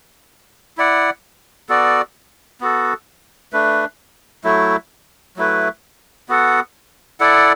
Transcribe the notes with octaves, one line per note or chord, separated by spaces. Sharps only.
E4 D5 F#5
B3 F#4 A4 D5
B3 F#4 A4
A3 D4 B4
F#3 A3 E4
F#3 A3 E4 B4
B3 F#4 A4 F#5
E4 A4 D5 F#5